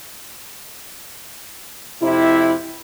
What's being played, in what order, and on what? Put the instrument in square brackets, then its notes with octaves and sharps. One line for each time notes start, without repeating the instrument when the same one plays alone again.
[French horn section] F2 C3 E4